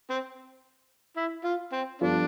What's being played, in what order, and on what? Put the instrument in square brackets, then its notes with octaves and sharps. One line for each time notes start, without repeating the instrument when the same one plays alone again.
[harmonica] C4
E4
F4
C4
[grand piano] G2 F3 B3 F4 A4 [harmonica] D4